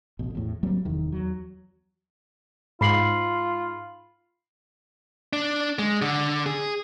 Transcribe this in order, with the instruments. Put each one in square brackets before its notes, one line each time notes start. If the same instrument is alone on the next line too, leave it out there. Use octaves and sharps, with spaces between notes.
[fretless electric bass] A1 B2
E2 A2
F#3 G3 A#3 C4
F1 E2 D#3
E2 F#3
[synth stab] G#2 [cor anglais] F4 [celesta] B5 C7 F#7
[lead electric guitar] D4
G#3
D3
G#4